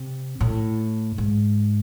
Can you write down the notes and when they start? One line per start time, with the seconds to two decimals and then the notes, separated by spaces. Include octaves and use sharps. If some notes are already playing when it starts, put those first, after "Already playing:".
Already playing: C3
0.41 A2
1.18 G#2